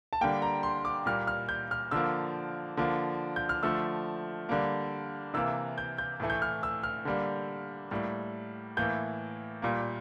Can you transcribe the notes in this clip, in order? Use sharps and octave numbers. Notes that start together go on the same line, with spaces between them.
A5
D3 G3 A#3 G5
A#5
C6
D6
A#2 G3 A#3 F6
F6
G6
F6
D3 F3 A#3 E6
D3 F3 A#3
G6
F6
D3 F3 A3 E6
D3 G3 A#3
C3 E3 A#3 E6
G6
G6
A2 E3 A3
G6
F6
E6
F6
D3 G3 A#3
A2 G3 A#3
A2 E3 A#3 G6
A#2 G3 A#3